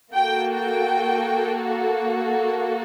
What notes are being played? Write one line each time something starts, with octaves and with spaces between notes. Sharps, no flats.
A#3 F#4 A4 G5
G5